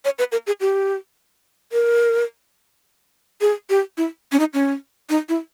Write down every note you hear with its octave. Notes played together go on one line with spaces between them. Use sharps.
C#5
B4
A#4
G#4
G4
A#4
G#4
G4
E4
C#4
D#4
C#4
D#4
E4